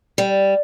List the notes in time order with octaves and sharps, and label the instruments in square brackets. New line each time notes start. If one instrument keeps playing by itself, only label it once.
[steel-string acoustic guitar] G3